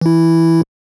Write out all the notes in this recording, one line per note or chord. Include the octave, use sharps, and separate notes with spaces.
E3 E4